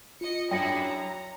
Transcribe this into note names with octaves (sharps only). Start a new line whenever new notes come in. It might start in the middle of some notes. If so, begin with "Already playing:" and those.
F4 D#5 C#7
F#2 D4 E4 G#4 G5 A#6 C#7
A#5